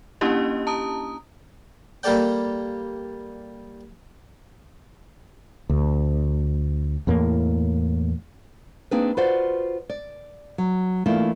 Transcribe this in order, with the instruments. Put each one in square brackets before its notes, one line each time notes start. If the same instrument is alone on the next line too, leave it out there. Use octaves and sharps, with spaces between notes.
[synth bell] A#3 C#4 D4 E4 G4 D#5
A5 A#5 D#6
[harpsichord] G3 A#3 G4 A4 D5 G5
[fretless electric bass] D2
E2 A2 A#3
[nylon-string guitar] A#3 C4 D4 D#4 G#4 B4
F4 F#4 B4 C5 D5 F#5
D5
F#3
E3 A3 A#3 D4 E4 F4